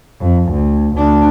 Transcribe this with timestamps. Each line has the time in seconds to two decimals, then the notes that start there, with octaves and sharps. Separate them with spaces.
0.21 F2
0.53 D2
0.97 D2 D4